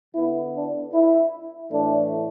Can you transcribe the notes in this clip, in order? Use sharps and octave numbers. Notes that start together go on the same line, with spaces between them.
D3 B3 E4
D4
E4
A2 E3 A3 D4